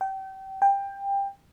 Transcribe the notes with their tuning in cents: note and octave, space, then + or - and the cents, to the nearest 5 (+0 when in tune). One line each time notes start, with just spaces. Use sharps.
G5 -30
G5 +20